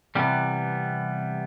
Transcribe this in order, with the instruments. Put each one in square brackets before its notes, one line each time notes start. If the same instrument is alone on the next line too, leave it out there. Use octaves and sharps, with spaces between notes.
[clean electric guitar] C3 E3 G3 B3